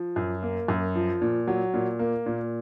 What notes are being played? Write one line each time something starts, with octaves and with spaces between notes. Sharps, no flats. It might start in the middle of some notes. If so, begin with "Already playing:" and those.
Already playing: F3
F#2
A#3
F#2
F3
A#2
F#3
A#2
A#3
A#2